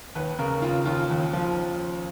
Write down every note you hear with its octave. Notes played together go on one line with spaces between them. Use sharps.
D#2 B4
C#3 A#4
C#3 F4
D#2 F4
D#2
F3